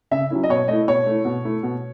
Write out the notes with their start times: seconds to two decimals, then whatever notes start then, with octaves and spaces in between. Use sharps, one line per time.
0.11 C#3 E5
0.30 F#3 C#4 E4
0.43 D#5
0.49 B2 C#5
0.68 A3 E4 D#5
0.88 B2 C#5
1.06 A3 E4
1.25 B2
1.45 A3 E4
1.63 B2